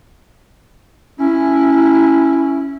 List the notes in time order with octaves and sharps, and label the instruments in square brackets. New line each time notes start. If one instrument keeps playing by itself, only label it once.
[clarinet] C#4 [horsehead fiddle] E4